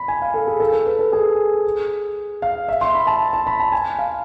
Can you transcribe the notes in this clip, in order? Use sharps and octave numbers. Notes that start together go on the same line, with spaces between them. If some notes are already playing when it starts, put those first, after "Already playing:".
Already playing: B5
G#5
F5
A4
G#4
A4
A4
B4
A4
G#4
F5
E5
C6
B5
A5
A5
B5
A5
G#5
F5